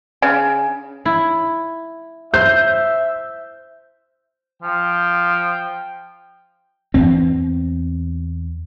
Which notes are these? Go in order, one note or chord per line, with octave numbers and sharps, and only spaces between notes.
C#3
E4
C5 E5 G6
F3 G5
E2 C4